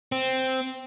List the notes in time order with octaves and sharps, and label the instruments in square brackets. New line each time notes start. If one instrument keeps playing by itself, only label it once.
[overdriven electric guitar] C4